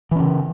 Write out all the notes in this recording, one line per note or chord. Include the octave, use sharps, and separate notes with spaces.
C#3 E3 C#4